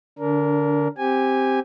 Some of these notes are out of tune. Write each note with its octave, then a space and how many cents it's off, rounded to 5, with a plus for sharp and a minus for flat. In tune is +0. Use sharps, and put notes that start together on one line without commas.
D3 +0 D4 -30 A#4 +0
C4 +0 G4 +0 G#5 -15